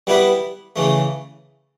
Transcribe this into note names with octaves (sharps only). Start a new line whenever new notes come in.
G3 B3 E4 G4 B4
C#3 E3 A3